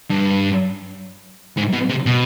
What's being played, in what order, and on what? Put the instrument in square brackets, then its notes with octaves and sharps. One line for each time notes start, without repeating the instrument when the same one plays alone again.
[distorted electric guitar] G2
G#2
B2
C3
B2